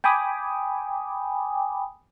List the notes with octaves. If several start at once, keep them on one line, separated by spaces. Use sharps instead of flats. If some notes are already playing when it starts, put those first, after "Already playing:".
G5 G#5 B5 D6 D#6